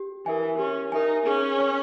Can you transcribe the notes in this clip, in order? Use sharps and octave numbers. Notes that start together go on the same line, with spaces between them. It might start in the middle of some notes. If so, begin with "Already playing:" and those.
Already playing: G4
E3 A#4 E5 G#5
C#4 G4
D#4 A#4 E5 G#5
C#4 G#4
C#5 G#5